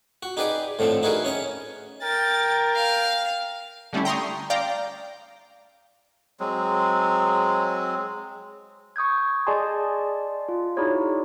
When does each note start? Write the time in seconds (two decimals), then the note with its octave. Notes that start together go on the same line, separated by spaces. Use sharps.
0.23 F#4
0.37 D#4 G4 G#4 B4 D5 D#5
0.79 A2 D3 F3 C4 A4
1.03 D#4 E4 F#4 G#4 A#4 B4
1.25 C#4 C#5 D#5
2.03 A#4 G5 A6
2.76 F5
3.93 D3 G3 A3 C#4 E4
4.05 G5 A#5 C6 C#6 D#6
4.50 D5 F5 G5 A#5
6.40 F#3 G#3 C4
8.96 C#6 D#6 G6 G#6
9.47 G#4 D5 D#5 G#5 A5 C6
10.49 F4
10.77 D#4 E4 F#4 G#4 C#5 D5